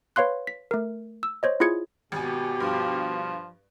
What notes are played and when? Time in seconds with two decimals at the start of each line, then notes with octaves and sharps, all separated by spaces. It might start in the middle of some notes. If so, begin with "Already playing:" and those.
0.16 B4 C#5 F5 C6 F#6
0.47 B6
0.71 A3 A#4
1.23 E6
1.43 C5 C#5 D#5
1.60 E4 F4 G#4 G#6 C#7
2.12 G#1 B2 G4 G#5
2.60 G2 F3